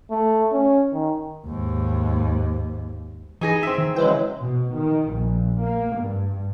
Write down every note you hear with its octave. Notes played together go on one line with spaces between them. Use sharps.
A3
C#4
D#3
D#2 G#2
E3 D#4 G#4 D#5
C4 E5
D#3
C#3 E3 F#3 G#3 B4 C5 G5
B2
D#3
A#1
A#3
G2